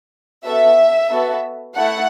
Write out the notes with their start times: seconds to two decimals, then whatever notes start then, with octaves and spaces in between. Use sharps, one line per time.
0.45 B3 F#4 A4 E5
1.10 B3 F#4 A4
1.75 A3 E4 F#5